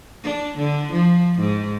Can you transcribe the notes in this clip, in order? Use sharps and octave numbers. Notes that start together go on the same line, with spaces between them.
D4
D3
F3
G#2